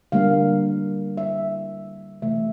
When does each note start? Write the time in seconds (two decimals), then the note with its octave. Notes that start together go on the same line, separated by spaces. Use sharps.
0.12 D3 G3 A#3 F5
1.17 E5
2.22 C3 E3 A3 E5